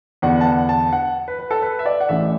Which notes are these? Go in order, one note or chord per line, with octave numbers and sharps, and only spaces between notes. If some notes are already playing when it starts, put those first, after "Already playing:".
E2 D3 B3 D4 F#5
A5
F#5
A5
F#5
B4
B4
A4
B4
E5
D5
F#5
A1 A2 E3 A3 D4 E5